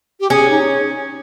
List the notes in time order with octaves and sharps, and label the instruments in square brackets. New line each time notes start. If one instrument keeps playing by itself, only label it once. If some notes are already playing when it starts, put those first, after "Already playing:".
[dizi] G4
[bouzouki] C#4 [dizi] G#4
[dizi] D#4